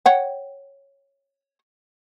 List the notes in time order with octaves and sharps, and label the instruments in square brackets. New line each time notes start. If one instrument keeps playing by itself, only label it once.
[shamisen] C#5 F#5 G5